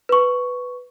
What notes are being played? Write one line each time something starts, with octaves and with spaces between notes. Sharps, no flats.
B4 C#6